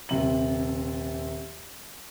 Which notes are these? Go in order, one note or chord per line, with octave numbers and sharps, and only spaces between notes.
D#1 C3 F#7